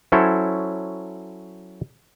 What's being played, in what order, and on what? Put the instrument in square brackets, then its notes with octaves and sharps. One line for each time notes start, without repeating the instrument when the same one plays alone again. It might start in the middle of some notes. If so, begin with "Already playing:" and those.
[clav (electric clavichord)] F#3 C#4 E4 A4 C5 C#5